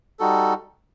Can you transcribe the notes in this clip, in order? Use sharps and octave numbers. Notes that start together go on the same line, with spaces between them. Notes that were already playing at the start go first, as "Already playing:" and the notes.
G3 D#4 F#4 A4